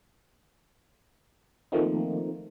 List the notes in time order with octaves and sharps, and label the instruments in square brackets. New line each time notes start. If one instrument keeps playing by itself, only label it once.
[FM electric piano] D#3 F3 A3 A#3 C4 D#4